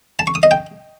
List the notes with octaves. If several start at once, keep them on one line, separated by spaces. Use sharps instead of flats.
A5
C#6
D#6
D#5
G5